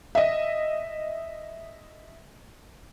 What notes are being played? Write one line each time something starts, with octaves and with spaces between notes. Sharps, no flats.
D#5 E5